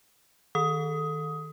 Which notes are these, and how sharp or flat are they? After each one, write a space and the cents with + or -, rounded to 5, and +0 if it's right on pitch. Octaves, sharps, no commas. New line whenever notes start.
D#3 +0 A4 +0 D#6 +15